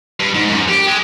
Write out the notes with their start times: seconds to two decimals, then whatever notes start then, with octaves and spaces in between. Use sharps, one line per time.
0.20 G2
0.34 G#2
0.49 F#2
0.69 G4
0.87 G#3